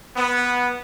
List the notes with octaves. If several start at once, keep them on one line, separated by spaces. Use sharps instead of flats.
B3